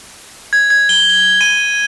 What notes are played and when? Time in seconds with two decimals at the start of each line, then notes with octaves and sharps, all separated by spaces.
0.53 G#6
0.70 G#6
0.89 G7
1.10 G7
1.41 D#7